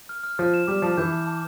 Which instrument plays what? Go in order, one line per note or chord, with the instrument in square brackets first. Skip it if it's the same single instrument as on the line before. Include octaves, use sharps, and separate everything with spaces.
[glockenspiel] F6
F6
[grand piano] F3 [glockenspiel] F6
[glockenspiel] E7
[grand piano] G3 [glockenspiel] D6
[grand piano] F3 [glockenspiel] A5
[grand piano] E3 [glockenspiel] G6
[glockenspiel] A5
A5